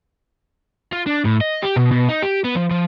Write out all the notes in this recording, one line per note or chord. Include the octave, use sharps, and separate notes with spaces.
F4
D4
A2
D#5
G4
B2
B2
D#4
G4
B3
F3
F3